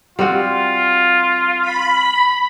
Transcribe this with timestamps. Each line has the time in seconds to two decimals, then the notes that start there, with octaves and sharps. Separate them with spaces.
0.19 G3 C4 F4 F#4
1.62 B5